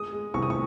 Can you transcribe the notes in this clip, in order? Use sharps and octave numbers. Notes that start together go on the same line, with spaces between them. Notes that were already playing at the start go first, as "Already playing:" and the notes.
Already playing: G#3 D#6
G#3
C2 C#6
D#6
C#6